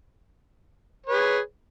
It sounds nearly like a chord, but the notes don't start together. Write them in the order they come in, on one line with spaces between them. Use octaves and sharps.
C#5 B4 G#4